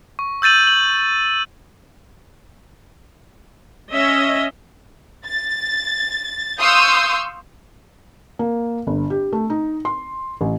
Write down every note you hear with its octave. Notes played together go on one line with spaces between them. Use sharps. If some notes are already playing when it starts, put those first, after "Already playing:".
C#6
E6 G6 A6 D#7 F#7
F#7
C#4 D#5 E5
A6
F5 C6 C#6 D#6 E6 G6
A#3
G1
G4
A3
D#4
C6
A1